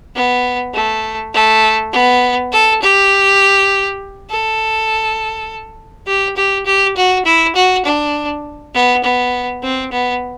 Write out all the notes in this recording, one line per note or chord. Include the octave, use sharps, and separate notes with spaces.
B3
A3
A3
B3
A4
G4
A4
G4
G4
G4
F#4
E4
F#4
D4
B3
B3
C4
B3